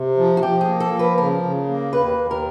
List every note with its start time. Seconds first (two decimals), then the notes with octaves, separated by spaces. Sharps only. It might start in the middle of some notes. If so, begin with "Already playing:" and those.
Already playing: C3
0.18 F3
0.37 F#4
0.42 F3 G4
0.61 G#4
0.68 A#3
0.80 A4
0.93 F3
0.99 B4
1.17 C#3 A#4
1.43 C#3
1.68 A#3
1.93 D#2 B4
2.17 D#2
2.31 A#4